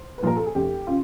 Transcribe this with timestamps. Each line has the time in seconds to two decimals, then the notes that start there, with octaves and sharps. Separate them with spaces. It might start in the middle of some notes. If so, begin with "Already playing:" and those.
Already playing: C5
0.18 B4
0.23 A#2 F3 A#4
0.37 A4
0.46 G#4
0.55 F1 G4
0.87 C#3 F4